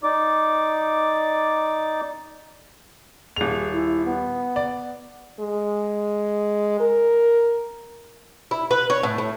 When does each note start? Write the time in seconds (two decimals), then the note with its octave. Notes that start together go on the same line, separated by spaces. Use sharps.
0.03 D#4 D5 D6
3.36 D#1 G#4 F7
3.72 E4
4.05 B3
4.56 D5
5.40 G#3
6.80 A#4
8.51 E4
8.71 B4
8.90 C#5
9.03 A2
9.18 A2